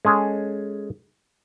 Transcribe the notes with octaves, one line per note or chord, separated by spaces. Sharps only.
G#3 C#4 G#4 A4